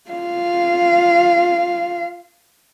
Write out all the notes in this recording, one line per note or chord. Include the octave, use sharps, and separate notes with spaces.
F4 F5